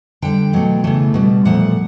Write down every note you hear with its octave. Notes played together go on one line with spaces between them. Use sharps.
D3 G3 G5
B2 F#3 A3
C#3 E3 A3
B2 G3
A#2 F3 A3 F#5